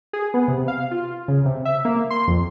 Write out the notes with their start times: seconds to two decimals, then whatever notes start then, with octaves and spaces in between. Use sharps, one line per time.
0.13 G#4
0.34 B3
0.48 C3
0.68 F5
0.91 F4
1.28 C#3
1.45 C3
1.65 E5
1.85 A#3
2.10 C6
2.27 F2